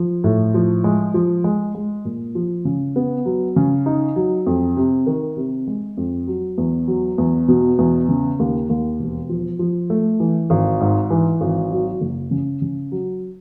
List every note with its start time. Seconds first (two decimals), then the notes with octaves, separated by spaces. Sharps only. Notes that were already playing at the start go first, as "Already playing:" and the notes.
Already playing: F3
0.24 A2
0.54 F3
0.84 G#3
1.14 F3
1.44 G#3
1.75 G#3
2.05 A#2
2.35 F3
2.65 C#3
2.96 B3
3.25 F#3
3.56 C#3
3.86 D#4
4.16 F#3
4.46 F2
4.77 C3
5.06 D#3
5.37 C3
5.67 G#3
5.97 F2
6.27 F#3
6.58 E2
6.88 F#3
7.18 E2
7.48 B2
7.78 E2
8.09 C#3
8.39 D#2
8.69 D#2
8.99 E1
9.29 F3
9.59 F3
9.90 A3
10.20 E3
10.50 G#1
10.80 G#2
11.10 E3
11.41 G#1
11.71 F#3
12.01 F#1
12.31 C#3
12.62 C#3
12.92 F#3